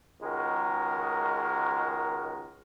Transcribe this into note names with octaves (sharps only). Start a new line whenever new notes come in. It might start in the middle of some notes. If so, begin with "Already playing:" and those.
C#2 D#3 G#3 F#4 A#4